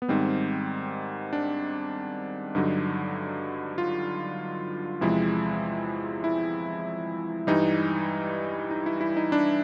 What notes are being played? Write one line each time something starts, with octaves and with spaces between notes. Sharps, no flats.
B3
G#2 D#3 G3 C4
D4
G2 D3 F#3 D#4
F4
E2 C3 F3 G#3 E4
E4
G2 E3 G3 D#4
D#4
E4
E4
D#4
D4